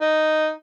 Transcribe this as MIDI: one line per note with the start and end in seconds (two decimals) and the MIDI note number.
0.01 0.51 63